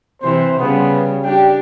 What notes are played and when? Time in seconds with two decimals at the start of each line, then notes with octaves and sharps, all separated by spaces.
0.22 C3 E3 C5
0.59 C#3 G3 B3
1.23 D4 G4 G5